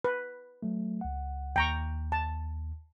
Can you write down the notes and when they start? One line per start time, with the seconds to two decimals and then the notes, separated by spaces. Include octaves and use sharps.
0.04 B4
0.63 F#3 A3
1.01 C#2 F#5
1.56 D#2 G5 A#5 C#6
2.12 A5